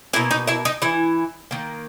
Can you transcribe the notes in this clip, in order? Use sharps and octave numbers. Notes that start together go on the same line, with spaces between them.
B2 A#3 E4 E5
D#4 D#5
E4 E5
D#4 D#5
E3 E4
D#3 A#3